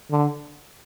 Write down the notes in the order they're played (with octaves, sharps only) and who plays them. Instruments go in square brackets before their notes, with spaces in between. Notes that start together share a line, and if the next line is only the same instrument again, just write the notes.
[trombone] D3